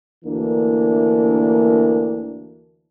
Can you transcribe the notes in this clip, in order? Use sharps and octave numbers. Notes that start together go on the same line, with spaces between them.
D2 E3 A#3 D4 A#4